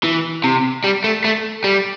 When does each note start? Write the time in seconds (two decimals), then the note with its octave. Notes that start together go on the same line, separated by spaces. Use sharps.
0.04 E3
0.44 C3
0.84 G3
1.04 A3
1.24 A3
1.64 G3